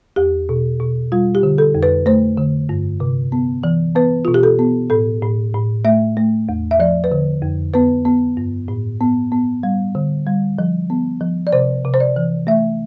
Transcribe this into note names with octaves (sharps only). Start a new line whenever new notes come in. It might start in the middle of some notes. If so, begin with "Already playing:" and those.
E2 G4
B2
B2
G3 F4
G4
D3
A4
F2
B4
A3 C5
D3
G2
C3
B3
E3
B3 B4
B2 F4
G4
A4
B3
A2 A4
A2
A2
A3 E5
A3
E2
E5
F3 D5
B4
D3
F2
B3 B4
B3
G2
A2
B3
B3
G3
D3
G3
F3
B3
F3
D5
C3 C5
C3
C5
D5
E3
A3 E5